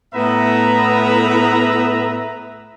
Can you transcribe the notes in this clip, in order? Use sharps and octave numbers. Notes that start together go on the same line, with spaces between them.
A2 B3 B4 E5 A#5